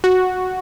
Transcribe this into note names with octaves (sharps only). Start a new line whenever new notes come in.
F#4